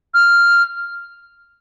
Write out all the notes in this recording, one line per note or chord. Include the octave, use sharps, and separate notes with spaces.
F6